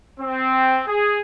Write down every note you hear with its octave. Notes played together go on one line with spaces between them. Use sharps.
C4
G#4